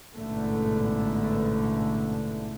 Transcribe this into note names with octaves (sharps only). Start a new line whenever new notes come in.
A1 G#2 B2 D3 A3